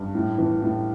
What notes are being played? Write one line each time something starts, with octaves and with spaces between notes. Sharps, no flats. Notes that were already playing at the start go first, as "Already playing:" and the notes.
Already playing: G2
A2
E3
A2